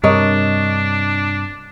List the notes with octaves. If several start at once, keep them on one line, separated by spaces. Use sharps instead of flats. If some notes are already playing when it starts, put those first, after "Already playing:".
G2 C3 D4 A#4 C#5 D#5